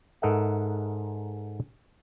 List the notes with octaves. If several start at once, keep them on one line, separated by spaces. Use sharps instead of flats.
G#2 A4 A#4 D#5 E5 F#5